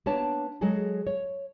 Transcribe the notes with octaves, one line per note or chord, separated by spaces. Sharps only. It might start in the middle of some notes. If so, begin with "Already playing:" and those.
A#3 B3 D4 C#5 A5
F#3 G#3 G#4 A4
C#5